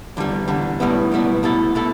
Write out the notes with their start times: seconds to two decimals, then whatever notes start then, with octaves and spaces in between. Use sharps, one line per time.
0.17 E2 D3 G3
0.48 E2 D3 G3
0.80 B1 A2 G3 B3 E4
1.12 B1 A2 G3 B3 E4
1.43 C2 B2 A3 E4 A4
1.75 B2 A3 E4 A4